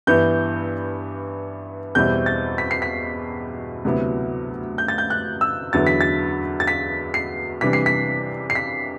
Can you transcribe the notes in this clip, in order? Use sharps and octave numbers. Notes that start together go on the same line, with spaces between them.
G2 E3 B3 E4 G6
E2 B2 G3 C4 E4 G6
A6
B6
C7
B6
D2 C3 F#3 B3 E4
G6
A6
G6
F#6
E6
E2 D3 F#3 B3 E4 A6
B6
A6
A6
B6
C7
C3 E3 G3 D4 B6
C7
B6
C7
B6